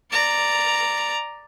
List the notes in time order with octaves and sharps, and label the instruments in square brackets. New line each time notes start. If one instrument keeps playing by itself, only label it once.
[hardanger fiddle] D5 A#5